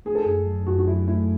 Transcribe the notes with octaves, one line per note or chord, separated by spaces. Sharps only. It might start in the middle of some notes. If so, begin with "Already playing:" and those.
A3 G#4
A4
F#2 G#4
F#3
F#2 F#4
F#4
F#3 E4
A3 E4